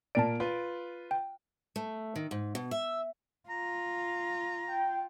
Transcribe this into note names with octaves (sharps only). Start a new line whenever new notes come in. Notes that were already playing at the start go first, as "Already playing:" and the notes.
A#2 A#4 D5 A5 D7
F4 B4
G5
A3
D#3
G#2
B2
E5
F4 A#5
G5